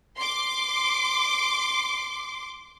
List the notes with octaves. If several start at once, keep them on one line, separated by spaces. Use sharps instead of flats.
C6 D6